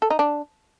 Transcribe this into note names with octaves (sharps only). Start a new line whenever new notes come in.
A4
D#4
D4